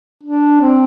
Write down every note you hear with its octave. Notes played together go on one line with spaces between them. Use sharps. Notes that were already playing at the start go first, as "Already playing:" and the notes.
D4
C4